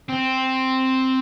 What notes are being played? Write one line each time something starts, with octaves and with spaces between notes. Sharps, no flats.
C4